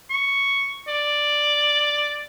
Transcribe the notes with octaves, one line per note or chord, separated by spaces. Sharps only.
C#6
D5